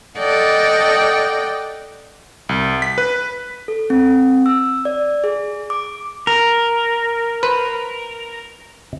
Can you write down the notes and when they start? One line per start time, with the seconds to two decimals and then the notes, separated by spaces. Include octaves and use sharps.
0.19 A4 D5 D#5 F#5 G5
2.49 C2
2.82 B6
2.98 B4
3.68 A4
3.90 C4
4.46 E6
4.85 D5
5.24 G#4
5.70 D6
6.27 A#4
7.43 B4 C5